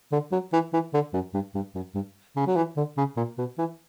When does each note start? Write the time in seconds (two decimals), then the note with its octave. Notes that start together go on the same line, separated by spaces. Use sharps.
0.12 D3
0.32 F#3
0.53 E3
0.73 E3
0.94 D3
1.13 F#2
1.34 G2
1.55 G2
1.75 F#2
1.95 G2
2.36 C#3
2.47 F#3
2.56 E3
2.77 D3
2.97 C#3
3.17 A#2
3.38 B2
3.58 E3